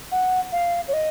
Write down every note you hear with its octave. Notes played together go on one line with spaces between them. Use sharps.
F#5
F5
C#5
D#5